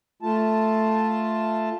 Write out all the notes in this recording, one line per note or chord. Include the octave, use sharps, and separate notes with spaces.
A3 F4 A5